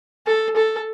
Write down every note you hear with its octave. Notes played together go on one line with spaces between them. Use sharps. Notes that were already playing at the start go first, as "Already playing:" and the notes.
A4
A4